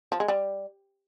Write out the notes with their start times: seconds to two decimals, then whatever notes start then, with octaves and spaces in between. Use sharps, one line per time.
0.12 F3
0.20 G#3
0.28 G3